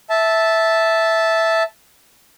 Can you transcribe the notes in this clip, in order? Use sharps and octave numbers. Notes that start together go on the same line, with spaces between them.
E5 A5